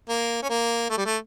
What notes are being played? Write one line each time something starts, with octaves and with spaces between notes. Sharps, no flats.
A#3
C#4
A#3
A3
G3
A3